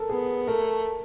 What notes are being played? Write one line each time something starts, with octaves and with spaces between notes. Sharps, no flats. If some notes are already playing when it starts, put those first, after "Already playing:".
Already playing: A4 A#4
B3 G#4
A3 A#4